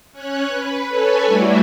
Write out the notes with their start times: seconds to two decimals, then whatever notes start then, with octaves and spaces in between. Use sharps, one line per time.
0.12 C#4 C#5 F#6
0.48 B4
0.88 A4 B4 C#5 G#5
1.26 G3 A3 D4 E4 F#4